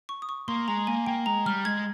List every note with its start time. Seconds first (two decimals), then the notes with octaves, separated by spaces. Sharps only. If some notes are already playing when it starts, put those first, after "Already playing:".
0.09 C#6
0.22 D#6
0.29 C#6
0.48 A#3 C6
0.68 G#3 A#5
0.87 A#3 G#5
1.06 A#3 G5
1.26 G#3 A#5
1.46 G3 F6
1.65 G#3 G#6